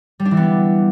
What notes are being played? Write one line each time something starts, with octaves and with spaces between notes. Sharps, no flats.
G3
D4
E3
B3